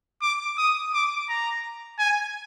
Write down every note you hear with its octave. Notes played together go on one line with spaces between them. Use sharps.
D6
D#6
D6
A#5
G#5